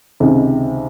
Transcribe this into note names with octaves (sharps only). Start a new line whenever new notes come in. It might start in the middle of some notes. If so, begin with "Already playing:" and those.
C#2 C3 D#3